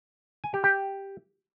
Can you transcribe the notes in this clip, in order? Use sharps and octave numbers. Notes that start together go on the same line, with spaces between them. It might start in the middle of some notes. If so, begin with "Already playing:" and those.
G#5
G4
G4